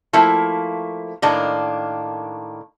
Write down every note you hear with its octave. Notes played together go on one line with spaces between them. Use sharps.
F3 A3 A#3 E4
A2 D#3 A#3 D4